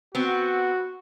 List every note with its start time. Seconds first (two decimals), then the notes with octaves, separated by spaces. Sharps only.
0.15 B3 C4 F#4